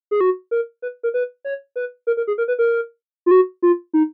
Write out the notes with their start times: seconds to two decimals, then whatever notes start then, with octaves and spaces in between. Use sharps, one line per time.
0.11 G#4
0.21 F#4
0.51 A#4
0.82 B4
1.03 A#4
1.14 B4
1.45 C#5
1.76 B4
2.07 A#4
2.17 A#4
2.27 G#4
2.38 A#4
2.48 B4
2.59 A#4
3.26 F4
3.31 F#4
3.62 F4
3.94 D#4